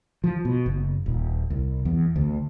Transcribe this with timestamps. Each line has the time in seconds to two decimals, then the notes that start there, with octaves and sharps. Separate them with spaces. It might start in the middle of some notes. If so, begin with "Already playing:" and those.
0.24 F3
0.45 B2
0.66 F#1
1.06 D#1
1.50 C2
1.85 E2
2.16 D2